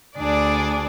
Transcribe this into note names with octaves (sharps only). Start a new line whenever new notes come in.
D2 D4 G#4 D5